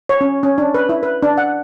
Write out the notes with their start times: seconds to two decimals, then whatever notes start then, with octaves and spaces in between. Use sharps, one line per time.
0.09 C#5
0.21 C#4
0.43 C#4
0.58 D4
0.74 B4
0.89 E4
1.03 B4
1.23 D4
1.38 F#5